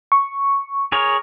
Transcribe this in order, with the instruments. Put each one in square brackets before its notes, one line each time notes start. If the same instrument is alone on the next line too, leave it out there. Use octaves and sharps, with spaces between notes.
[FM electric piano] C#6
[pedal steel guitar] G#4 A#4 C#5